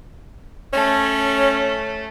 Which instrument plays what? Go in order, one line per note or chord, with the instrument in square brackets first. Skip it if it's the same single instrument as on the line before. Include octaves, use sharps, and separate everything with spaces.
[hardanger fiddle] A3 [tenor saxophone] C#4